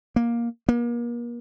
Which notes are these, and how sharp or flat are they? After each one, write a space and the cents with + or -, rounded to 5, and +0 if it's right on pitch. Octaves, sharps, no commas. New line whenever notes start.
A#3 +10
A#3 +35